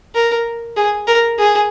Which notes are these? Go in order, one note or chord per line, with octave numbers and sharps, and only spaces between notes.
A#4
G#4
A#4
G#4